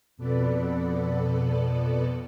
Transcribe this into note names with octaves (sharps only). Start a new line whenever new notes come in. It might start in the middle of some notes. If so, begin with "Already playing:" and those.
F2 B2 B3 A4 B4 D5